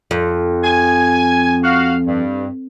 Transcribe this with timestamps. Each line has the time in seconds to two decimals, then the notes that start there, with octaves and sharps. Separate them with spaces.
0.11 F2
0.64 G#5
1.64 F#4 F5
2.06 G2